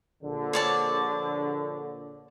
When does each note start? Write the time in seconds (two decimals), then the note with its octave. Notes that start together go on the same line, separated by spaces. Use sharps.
0.23 A#1 D3
0.53 C#5 D5 A5